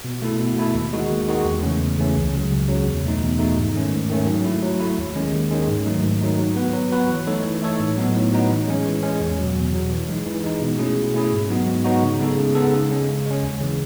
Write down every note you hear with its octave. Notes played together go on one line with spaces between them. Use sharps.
B2
A3 E4 A4
B2
A3 E4 A4
D#2
D#3 G#3 D#4 F#4
D#2
D#3 G#3 D#4 F#4
E2
C#3 E3 A3 C#4
E2
C#3 E3 A3 C#4
C#2
C#3 F#3
C#2
C#3 F#3
E2
B2 A3 D#4
E2
B2 A3 D#4
G#2
D#3 A3 C#4
G#2
D#3 A3 C#4
F#3
A3 E4
F#3
A3 E4
D#2
D#3 G#3 C#4
D#2
D#3 G#3 C#4
G#2
D#3 F#3 A3 D#4
G#2
D#3 F#3 A3 D#4
F#3
B3 F#4 B4
F#3
B3 F#4 B4
E3
A3 D#4 A4 C#5
E3
A3 D#4 A4 C#5
A2
F#3 B3 D#4
A2
F#3 B3 D#4
E3
G#3 C#4
E3
G#3 C#4
E2
B2 F#3
E2
B2 F#3
E3
G#3 D#4
E3
G#3 D#4
B2
A3 C#4 E4 G#4
B2
A3 C#4 E4 G#4
G#2
F#3 B3 D#4 F#4
G#2
F#3 B3 D#4 F#4
C#3
G#3 B3 D#4 A4
C#3
G#3 B3 D#4 A4
C#3
G#3 C#4
C#3
G#3 C#4
D#2
C#3 E3